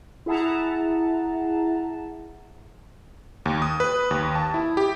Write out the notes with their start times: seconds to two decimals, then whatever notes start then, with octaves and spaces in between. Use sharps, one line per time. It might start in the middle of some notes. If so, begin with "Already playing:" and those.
0.26 E4 G#4 E5 F#5 A5 A#5
3.46 D#2
3.62 D#6
3.80 B4
4.11 D#2
4.35 A5
4.54 E4
4.77 G4